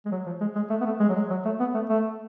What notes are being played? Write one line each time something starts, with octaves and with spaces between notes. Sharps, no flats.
G#3
F#3
F3
G#3
G#3
A3
B3
A3
G#3
F#3
G#3
F#3
A3
B3
A3
A3